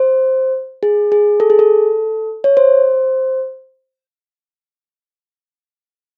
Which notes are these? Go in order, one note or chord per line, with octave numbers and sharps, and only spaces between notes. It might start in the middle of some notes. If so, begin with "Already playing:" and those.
Already playing: C5
G#4
G#4
A4
G#4
A4
C#5
C5